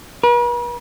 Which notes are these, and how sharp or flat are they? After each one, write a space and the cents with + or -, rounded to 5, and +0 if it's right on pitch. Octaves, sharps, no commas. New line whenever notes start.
B4 -45